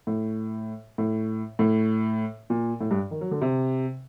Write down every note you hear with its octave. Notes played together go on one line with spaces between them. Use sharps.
A2
A2
A2
A#2
A2
G2
D#3
F#3
D3
C3